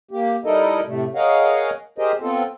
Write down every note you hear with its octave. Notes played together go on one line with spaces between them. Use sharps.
A#3 G4
G3 D#4 E4 A4 A#4 D#5
A2 C3 A3
G#4 A#4 C#5 D#5 F5 F#5
G4 G#4 A#4 C5 D#5
B3 C4 F4 A4